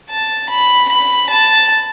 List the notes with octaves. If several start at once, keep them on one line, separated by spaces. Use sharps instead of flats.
A5
B5
B5
A5